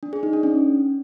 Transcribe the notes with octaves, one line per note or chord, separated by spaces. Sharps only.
D4
G#4
D#4
D4
C#4